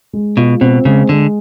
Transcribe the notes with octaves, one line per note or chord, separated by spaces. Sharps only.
G#3
B2 F4
B2 C4
C#3 G#3
D3 G#3